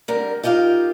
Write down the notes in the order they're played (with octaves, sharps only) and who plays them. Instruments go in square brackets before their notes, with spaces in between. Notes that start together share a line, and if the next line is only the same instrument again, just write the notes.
[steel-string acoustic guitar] D3 G3 A#4
D#4 F4 G4 A#4 F5